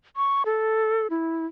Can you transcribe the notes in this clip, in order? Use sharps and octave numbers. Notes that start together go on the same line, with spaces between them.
C#6
A4
E4